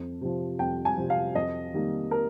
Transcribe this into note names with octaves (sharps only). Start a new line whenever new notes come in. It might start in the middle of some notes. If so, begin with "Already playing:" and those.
Already playing: F2
C3 F3
F2 G5
G#5
C3 F3
F5
F2 D#5
D#3 G3 A#3
A#4